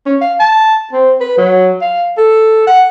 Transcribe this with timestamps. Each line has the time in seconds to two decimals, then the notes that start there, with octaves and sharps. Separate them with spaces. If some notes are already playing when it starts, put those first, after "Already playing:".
0.06 C#4
0.21 F5
0.39 A5
0.93 C4
1.21 B4
1.38 F#3
1.81 F5
2.17 A4
2.67 F#5